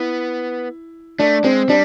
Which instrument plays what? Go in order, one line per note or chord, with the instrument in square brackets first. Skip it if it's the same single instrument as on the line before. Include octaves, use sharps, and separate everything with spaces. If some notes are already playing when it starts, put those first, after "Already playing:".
Already playing: [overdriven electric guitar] B3 [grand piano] E4
[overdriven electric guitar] A3 [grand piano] D4
[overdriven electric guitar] G#3 [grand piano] C4
[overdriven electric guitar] G3 [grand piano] D4